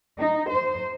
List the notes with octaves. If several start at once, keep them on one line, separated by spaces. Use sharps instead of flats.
D#4
C5